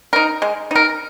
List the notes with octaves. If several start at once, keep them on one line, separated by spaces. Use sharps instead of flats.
D#4 A#4
G#3
D#4 A#4